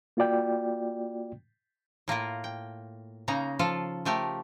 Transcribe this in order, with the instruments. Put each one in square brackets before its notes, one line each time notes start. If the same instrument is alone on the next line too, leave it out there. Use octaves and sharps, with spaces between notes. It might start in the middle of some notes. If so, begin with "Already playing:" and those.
[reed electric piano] A#3 F4 F#4 D5 G5
[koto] A2 A#3 F4 A#4
G5
C#3 A#3 D#4 A#5
F3 F4 A4
F3 A3 G4 A#4